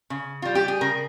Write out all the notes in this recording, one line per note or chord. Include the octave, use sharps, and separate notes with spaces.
C#3
G3 F4
G4
G#4
C#3 A#4